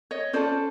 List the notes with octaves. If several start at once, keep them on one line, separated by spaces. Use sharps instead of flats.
C#5 D#5
C#4 F4 A4 C5 D5